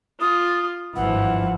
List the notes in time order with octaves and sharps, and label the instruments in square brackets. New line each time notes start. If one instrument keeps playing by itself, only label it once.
[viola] F4 [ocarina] D#6
[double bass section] G#1 G2 F3 [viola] E3 [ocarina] F#5